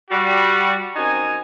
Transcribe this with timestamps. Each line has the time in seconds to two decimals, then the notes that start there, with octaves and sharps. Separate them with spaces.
0.11 G3 F#4
0.96 F#2 C4 D#4 F#4 G#5